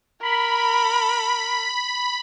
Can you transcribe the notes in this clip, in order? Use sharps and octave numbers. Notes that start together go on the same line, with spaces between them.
A#4 B5